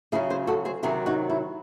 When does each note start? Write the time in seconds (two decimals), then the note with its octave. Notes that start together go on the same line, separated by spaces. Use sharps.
0.12 C#3 F#3 C#4 E4 G#4
0.30 G#4 C5
0.47 F#4 A4
0.65 G#4 C5
0.83 C3 D#3 F#3 C4 E4 G#4
1.06 D#4 F#4
1.30 E4